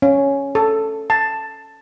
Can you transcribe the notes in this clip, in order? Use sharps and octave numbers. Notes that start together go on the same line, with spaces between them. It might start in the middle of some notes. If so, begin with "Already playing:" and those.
C#4
A4
A5